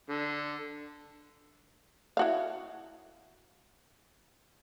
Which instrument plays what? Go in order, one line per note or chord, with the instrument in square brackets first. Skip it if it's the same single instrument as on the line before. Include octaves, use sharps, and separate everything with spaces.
[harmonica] D3
[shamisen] E4 F#4 F5